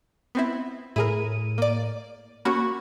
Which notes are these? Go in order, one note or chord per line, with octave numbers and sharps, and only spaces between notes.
B3 C4 E4
A2 E4 G#4 A#4 D#7
A#3 D5
A#3 C#4 F#4 B5 C#6